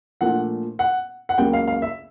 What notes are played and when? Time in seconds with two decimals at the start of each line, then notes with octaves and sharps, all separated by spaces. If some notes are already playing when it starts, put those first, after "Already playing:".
0.21 A#2 F3 A3 D4 F#5
0.79 F#5
1.29 F#5
1.38 C#2 C#3 F#3 A#3 G5
1.53 F5
1.68 F5
1.82 E5